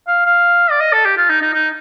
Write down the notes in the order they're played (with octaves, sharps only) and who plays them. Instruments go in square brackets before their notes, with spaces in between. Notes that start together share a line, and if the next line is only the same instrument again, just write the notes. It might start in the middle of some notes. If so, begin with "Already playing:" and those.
[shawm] F5
F5
D5
D#5
A4
G4
F4
D#4
D#4
D#4